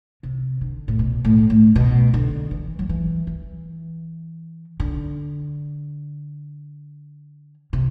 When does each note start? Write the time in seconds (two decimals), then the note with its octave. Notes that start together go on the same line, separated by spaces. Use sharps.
0.23 C3
0.61 D3
0.88 A2
0.99 B2
1.25 A2
1.50 A2
1.75 B2
2.14 D3
2.51 E3
2.79 F#3
2.89 E3
3.27 E3
4.80 D3
7.73 C3